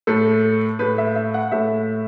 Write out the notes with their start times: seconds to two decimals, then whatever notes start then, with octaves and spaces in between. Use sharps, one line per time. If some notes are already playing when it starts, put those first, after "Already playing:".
0.07 A2 A3 A4
0.79 A2 A3 B4
0.98 E5
1.16 E5
1.34 F#5
1.52 A2 A3 E5